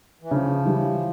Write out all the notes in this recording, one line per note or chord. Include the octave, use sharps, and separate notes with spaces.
E3
C#3 F3
E3 G3